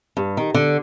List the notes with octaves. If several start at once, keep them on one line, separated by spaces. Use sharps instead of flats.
G2
D#3
D3